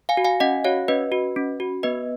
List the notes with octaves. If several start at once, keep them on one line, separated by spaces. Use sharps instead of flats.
F5 G#5
F#4
F5 G#5
C#4 D#5 F#5
F#4 C#5 F5
C#4 B4 D#5
F#4
C#4
F#4
B3 B4 D#5